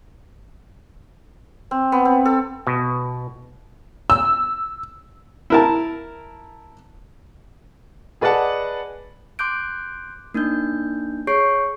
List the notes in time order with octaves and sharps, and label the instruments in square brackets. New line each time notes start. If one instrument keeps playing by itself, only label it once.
[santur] C4
B3
C4
A4
[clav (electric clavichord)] B2
[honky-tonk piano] E6
[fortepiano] E4 A#4 A5
[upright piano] G#4 B4 D5 D#5 F#5 A5
[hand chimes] C6 D6 F#6 G6 D7
A#3 D4 D#4 G6
G#4 C#5 C#6 G6 C7 D7